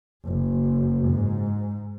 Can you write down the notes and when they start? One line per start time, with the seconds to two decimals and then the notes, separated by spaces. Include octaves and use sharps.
0.24 F#1
1.08 G#2